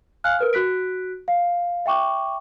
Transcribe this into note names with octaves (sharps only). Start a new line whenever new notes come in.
F5 G#5 F6 F#6
A#4 B4 F6
F#4 F#6 B6 D7
F5
E5 G5 C#6 D6